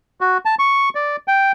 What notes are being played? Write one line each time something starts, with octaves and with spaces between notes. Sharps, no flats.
F#4
A5
C#6
D5
G5